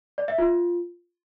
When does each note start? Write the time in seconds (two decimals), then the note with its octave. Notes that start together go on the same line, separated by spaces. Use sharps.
0.18 D5
0.28 E5
0.38 F4